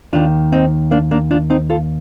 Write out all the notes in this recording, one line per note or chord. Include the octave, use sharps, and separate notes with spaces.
D#2 D#3 D4 F4
C4 D#4
A#3 D4
A#3 D4
D4 F4
C4 D#4
F4 A4